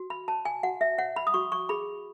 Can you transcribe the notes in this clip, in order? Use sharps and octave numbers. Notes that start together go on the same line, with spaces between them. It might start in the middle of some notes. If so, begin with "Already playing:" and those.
Already playing: F#4
B5
C#5 A5
G#5
F#4 F#5
E5
C#5 F#5
B5
D#6
F#4 C#6
C#6
G#4 B5